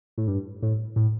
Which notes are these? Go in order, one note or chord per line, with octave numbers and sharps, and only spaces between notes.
A2
G2
A2
A2